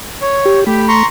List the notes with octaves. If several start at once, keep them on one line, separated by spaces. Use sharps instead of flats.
C#5
G4
A3 G4 B5
A#5 C6 C#6